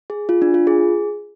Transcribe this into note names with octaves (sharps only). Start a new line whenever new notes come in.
G#4
F4
D4
F4
G#4